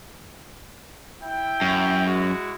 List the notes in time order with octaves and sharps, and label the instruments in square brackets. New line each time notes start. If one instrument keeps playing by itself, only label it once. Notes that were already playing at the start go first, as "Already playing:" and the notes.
[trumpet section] E4 G5
[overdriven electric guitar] F#2
[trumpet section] G#3 E4 F#4